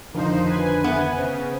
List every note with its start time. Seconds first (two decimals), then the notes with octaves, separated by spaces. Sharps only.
0.14 F2 D3 D#3 F3 D4 D#4 C5
0.46 B4 G#5
0.84 B3 E5
1.16 C#3 C5